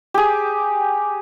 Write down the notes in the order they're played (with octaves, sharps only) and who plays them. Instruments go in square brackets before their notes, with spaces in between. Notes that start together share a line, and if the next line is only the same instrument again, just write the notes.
[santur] G4 G#4